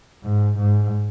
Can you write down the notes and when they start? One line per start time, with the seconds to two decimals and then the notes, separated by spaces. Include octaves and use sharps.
0.24 G#2
0.58 G#2